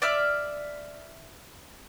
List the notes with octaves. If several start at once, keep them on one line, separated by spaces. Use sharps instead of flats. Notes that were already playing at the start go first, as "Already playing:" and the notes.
D5 E5 F6